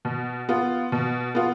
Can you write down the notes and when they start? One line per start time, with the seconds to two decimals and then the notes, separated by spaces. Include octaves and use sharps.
0.05 B2
0.49 B3 F4
0.92 B2
1.35 B3 F4